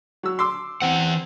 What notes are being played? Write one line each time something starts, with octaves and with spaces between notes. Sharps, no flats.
F#3 E6
C6 D6 E6
E3 C4 F#5